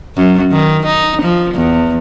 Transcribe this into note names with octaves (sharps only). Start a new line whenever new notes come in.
F#2
D#3
D#4
F3
E2